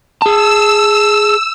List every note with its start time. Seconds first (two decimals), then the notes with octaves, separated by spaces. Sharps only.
0.22 G#4 A5 E6